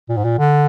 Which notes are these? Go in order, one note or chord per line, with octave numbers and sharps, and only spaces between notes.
A#2
G#2
A#2
D3